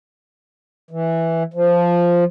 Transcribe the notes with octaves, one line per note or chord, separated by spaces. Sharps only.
E3
F3